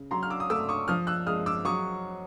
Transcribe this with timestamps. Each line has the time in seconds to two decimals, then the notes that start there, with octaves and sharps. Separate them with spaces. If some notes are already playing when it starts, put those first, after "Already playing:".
Already playing: C#3
0.11 F#3 A#5 C6
0.23 F6
0.30 D6 E6
0.40 D#6
0.50 A3 D6 E6
0.69 C#6 D#6
0.88 F3 D#6 F6
1.07 E6 F#6
1.27 G#3 D#6 F6
1.46 D6 E6
1.65 F#3 C#6 D#6